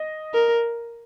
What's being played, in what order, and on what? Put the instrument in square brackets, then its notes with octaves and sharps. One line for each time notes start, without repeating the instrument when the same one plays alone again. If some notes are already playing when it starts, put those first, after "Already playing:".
Already playing: [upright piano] D#5
[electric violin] A#4